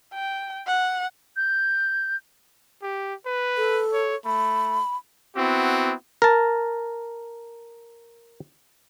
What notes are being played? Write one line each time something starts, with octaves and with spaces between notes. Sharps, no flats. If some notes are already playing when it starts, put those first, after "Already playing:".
G5
F#5
G6
G4
B4
A4
C#5
A3 B5
B3 C4 E4 F#4
A#4 A5